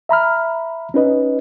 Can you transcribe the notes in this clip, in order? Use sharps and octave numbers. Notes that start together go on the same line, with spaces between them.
E5 A#5 B5 F6
C#4 D#4 B4 D#5